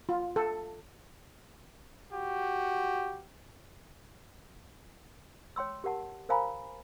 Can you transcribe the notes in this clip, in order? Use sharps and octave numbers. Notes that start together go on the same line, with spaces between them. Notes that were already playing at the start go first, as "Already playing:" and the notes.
F4
A4
F#4 G4
C#5 G5 C6 E6
G4 A#4 F#5 A5
A#4 C5 F5 G#5 A#5 B5